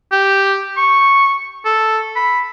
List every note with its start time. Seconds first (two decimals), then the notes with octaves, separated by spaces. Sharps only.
0.12 G4
0.77 C#6
1.65 A4
2.16 B5